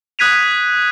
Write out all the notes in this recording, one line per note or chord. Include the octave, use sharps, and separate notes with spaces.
D#6 F#6 G#6 B6 D#7 F7